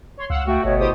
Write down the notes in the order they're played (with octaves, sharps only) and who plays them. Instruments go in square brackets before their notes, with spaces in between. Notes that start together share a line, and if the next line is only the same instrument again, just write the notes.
[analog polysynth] C#5 C6
[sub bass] C#2 [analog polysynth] F5 F#5 E6
[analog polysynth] A3 [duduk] F#4 [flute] G5
[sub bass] G1 [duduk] B2 [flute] C#5
[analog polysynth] E4 G4 D#6 [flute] C5